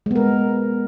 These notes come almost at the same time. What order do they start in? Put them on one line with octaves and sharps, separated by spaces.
G#3 B3 A#4